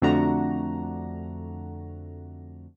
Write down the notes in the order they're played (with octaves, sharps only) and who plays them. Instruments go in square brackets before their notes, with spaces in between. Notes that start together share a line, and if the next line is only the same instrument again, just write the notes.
[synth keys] F2 D3 A3 D4 F#4 A#5